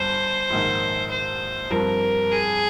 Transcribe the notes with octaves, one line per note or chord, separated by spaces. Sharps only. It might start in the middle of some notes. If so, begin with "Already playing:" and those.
Already playing: G1 G2 C5
A#1 G#2 D#3
C5
G2 F3 C4 A#4
G#4